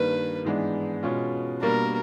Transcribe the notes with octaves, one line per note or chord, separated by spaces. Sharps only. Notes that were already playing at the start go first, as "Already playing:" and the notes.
Already playing: G2 D#3 G3 A#3 B4
G#2 E3 G#3 B3 D4
B2 G#3 C#4 F4
B2 G3 A#3 D4 A#4